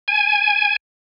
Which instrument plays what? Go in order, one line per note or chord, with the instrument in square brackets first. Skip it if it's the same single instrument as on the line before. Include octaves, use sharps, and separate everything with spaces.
[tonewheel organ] G#5